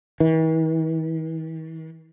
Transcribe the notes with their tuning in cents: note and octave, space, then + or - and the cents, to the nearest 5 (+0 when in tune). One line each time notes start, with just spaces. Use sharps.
E3 -45